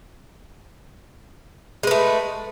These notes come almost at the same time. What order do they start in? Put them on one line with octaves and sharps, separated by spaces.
G#3 B4 A3